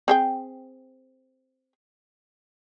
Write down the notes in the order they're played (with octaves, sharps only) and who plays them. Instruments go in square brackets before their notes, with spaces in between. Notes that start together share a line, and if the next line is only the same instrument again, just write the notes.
[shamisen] C4 G#4 G5